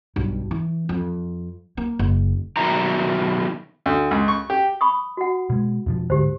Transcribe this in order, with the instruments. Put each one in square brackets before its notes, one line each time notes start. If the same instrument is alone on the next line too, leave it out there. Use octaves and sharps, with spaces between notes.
[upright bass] B1 G2
E3
F2
A#3
F#1
[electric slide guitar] B2 D#3 F#3 E4 A#5
[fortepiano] D2
C#2
C#6
G4
[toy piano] B5 C#6 D#6
F#4 F#5
[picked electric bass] B2 G#3
E2 B2 F3
[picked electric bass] D1 G#2 D3 [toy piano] G4 C5